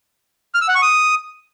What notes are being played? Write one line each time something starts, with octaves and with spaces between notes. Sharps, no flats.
F6
E6
F#5
C#6
D#6